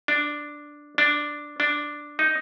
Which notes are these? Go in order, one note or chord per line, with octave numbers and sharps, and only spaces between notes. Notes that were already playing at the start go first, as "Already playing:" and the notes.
D4
D4
D4
D#4